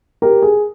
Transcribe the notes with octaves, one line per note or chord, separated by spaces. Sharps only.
G4 A#4
G#4